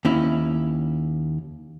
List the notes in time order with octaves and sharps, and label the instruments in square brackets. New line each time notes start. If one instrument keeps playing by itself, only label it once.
[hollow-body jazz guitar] D#2 C#4 E4